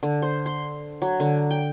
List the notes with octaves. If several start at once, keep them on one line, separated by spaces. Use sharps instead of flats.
D3
C5
C6
F#3
D3
G5